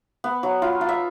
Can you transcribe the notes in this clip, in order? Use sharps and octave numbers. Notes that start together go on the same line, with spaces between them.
B3
F#3
F4
F4
E5